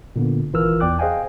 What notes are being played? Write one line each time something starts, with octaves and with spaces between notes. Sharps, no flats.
A#2 D3 B3
G#1 E3 F4 A#4 E6 F6
E2 D5 G5 D6 F#6
G#4 C5 D#5 F5 G5 G#5